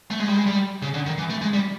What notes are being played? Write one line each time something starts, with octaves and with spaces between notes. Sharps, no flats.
A3
G#3
G3
G#3
G3
C#3
D3
D#3
E3
A3
G#3
G3